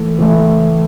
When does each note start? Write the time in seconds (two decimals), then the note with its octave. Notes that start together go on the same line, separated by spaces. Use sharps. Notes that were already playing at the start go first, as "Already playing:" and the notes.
Already playing: A2 E3 A3
0.19 A2 E3 A3